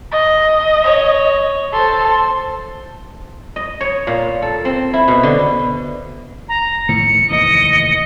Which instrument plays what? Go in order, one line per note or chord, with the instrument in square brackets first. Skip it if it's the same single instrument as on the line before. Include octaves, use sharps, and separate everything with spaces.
[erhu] D#5
[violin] C#5
[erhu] A4 [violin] C5 C6
[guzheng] D#5
C#5
A#2
A4
C4
E4
B2
D3
[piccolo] A#5
[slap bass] A2 D#3 F3 [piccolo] C#7
[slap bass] F1 D#2 E3 [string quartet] D#5